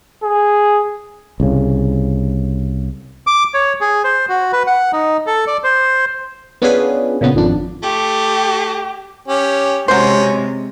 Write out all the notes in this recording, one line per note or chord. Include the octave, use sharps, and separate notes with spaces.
G#4
C2 C#3
D6
C#5
G#4
C5
F#4
B4
F#5
D#4
A4
D5
C5
B3 C#4 D4 F4 G#4 B4
A#2 C#3 B3
G#1 F2 D4
A3 G4
C#4 G4
C3 F#3 G#3 C#4 C5